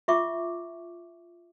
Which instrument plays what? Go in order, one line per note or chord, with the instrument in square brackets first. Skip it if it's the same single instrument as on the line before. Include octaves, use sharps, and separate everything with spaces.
[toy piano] F4 E5 C#6 D6